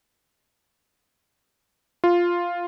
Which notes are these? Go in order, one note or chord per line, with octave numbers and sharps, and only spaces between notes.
F4